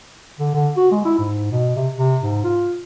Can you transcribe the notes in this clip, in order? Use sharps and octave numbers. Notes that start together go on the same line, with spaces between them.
D3
D3
F#4
G#3
E4
G#2
B2
C3
C3
G#2
F4